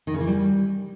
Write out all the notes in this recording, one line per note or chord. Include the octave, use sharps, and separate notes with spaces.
D#3
C#3
E3
G3